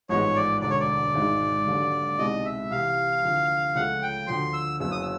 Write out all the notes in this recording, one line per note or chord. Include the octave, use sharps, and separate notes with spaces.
A1 G#2 F3 G#3 B3 C#5
D5
E1 D2 D3 D5
C#5
D5
G#1 G#2 D#3 G#3
D#2 D3 F#3
C2 B2 G#3 C4 D#4 D#5
E5
C2 C3 E3 F5
D2 D3 F3
C#2 C#3 F3 A3 F#5
G5
D2 D3 F3 C6
E6
F#1 F#2 C#3 F#3 B3 E6
D#6
E6